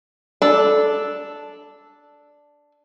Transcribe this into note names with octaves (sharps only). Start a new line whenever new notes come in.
D4 A4